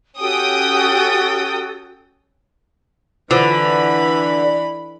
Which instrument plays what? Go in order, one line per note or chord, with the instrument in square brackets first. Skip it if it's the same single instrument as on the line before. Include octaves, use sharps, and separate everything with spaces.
[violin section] C#4 G5 D#6 [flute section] F#4 G4 A4
[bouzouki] D3 [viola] E3 B5 [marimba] E4 F4 C5 [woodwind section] B4